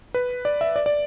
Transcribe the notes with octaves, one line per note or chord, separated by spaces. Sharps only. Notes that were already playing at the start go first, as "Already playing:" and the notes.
B4
D5
E5
D5
D5